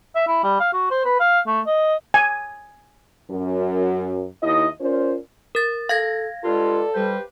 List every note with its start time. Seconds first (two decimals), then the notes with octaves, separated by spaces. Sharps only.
0.16 E5
0.28 E4
0.44 G3
0.60 F5
0.73 F#4
0.90 C5
1.05 B4
1.20 F5
1.47 A3
1.66 D#5
2.14 G#5
3.30 F#2
4.43 D#2 E4 D#5
4.81 C#4 F4 A#4 C5 D5
5.55 A#4 A6
5.89 A4 F5 G#6 A#6
6.44 G2 G#3 F4 A4 D5
6.95 G3 G4 B4 C5